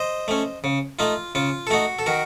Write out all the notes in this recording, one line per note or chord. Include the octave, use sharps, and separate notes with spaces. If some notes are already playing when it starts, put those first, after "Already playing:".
Already playing: C5 D#5
A3 C#4
C#3
A3 D#4 F4
C#3 F4
A4
A3 D#4 F#4
A4
D#3 F#4 A#4